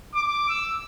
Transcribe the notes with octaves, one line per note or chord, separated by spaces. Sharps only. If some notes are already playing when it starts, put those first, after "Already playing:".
D6
E6